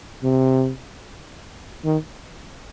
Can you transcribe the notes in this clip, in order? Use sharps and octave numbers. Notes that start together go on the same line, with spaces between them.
C3
D#3